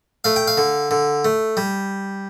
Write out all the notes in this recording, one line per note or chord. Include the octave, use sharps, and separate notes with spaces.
A3 F5
G5
F5
D3
D3
A3
G3